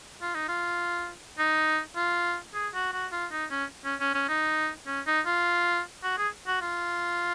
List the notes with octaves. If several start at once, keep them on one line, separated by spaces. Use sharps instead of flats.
F4
D#4
F4
D#4
F4
G#4
F#4
F#4
F4
D#4
C#4
C#4
C#4
C#4
D#4
C#4
D#4
F4
F#4
G#4
F#4
F4